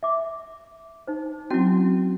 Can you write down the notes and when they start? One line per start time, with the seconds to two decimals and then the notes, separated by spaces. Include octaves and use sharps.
0.03 E5 D6
1.07 D#4 C5
1.51 F#3 C4 C#4 E4 F#4